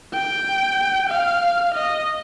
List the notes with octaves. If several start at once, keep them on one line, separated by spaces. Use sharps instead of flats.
G5
F5
D#5